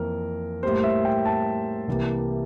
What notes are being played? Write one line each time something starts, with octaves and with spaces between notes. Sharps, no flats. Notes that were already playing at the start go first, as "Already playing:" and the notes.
Already playing: F2 E3 A#3 A#4
A2 G3 A#3 C5
E5
G5
A5
C2 C3 E3 G3 A#3